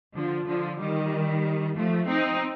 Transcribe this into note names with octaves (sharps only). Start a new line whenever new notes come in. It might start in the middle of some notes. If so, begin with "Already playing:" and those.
D3 F3
D3 F3
D#3 G3
F3 A3
C4 D#4